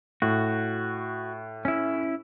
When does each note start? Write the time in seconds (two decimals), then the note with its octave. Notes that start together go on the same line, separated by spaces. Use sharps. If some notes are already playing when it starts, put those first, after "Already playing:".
0.22 A2 F#4
1.65 C#4 E4